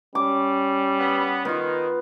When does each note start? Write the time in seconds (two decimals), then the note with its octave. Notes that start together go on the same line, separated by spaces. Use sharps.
0.15 G3 C#4 D6
0.98 B3
1.45 D#3 B3 F4